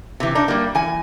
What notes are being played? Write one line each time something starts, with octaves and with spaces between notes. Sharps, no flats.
C3 E3
D4 D#4
G3 A#3
E3 G#5